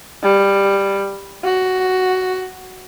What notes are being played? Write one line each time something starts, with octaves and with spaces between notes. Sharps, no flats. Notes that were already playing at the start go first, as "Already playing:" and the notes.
G3
F#4